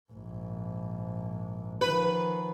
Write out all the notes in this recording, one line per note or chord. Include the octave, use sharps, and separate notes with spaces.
A#1 G#2
D#3 F3 B4